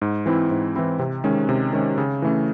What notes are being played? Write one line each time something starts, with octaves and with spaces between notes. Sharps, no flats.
G#2
E3 C4 E4
G#2
E3 C4 E4
C3
D#3 G#3 C#4
C3
D#3 G#3 C#4
C#3
E3 A3 C#4